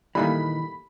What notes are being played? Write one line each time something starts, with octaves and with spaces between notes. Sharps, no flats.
A#2 D#3 E3 G3 A3 A#3 B5